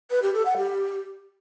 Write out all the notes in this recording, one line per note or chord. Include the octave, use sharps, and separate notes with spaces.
B4
G4
A4
F#5
G4